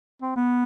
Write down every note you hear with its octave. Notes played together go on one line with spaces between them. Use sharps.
C4
B3